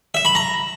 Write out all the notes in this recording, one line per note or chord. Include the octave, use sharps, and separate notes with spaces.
E5
B5
A#5